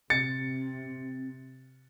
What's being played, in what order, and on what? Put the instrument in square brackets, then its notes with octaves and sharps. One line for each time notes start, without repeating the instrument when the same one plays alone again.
[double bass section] C3 [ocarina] C4 [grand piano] A6 [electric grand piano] C#7